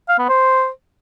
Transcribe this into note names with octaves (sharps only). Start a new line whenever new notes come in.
F5
B3
C5